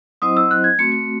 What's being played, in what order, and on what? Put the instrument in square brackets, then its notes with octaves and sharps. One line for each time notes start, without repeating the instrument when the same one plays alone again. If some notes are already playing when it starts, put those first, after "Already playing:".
[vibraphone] F#3 C4 E4 C5 D#5 [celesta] D#6
[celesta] E6
F#6
G#6
[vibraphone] A3 C4 F#4 [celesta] C#7
[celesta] C#7